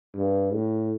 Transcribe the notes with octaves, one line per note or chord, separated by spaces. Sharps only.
G2
A2